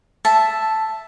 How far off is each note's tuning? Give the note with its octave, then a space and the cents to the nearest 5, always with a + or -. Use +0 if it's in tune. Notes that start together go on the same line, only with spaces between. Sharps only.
E5 +5 A5 +0